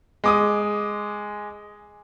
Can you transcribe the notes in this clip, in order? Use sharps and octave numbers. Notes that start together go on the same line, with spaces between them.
G#3 D6 D#6